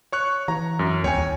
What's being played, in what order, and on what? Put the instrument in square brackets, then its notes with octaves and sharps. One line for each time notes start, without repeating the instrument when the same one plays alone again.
[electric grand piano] C#5 C#6 F#6
[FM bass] E3 [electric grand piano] A#5
[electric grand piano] F#2
[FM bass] D#2 [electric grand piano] C#5 G5 G#5
[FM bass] D#2